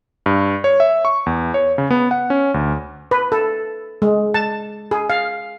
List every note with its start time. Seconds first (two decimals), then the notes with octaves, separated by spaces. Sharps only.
0.26 G2
0.64 C#5
0.80 E5
1.05 C#6
1.26 E2
1.54 C#5
1.78 C#3
1.91 B3
2.11 F#5
2.30 C#4
2.54 D2
3.11 B4
3.32 A4
4.02 G#3
4.34 A5
4.91 G#4
5.10 F5